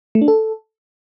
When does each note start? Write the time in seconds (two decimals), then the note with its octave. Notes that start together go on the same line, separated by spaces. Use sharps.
0.15 A3
0.22 D4
0.28 A4